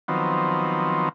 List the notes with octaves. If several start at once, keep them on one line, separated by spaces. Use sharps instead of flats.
D#3 F3 F#3 B3 C4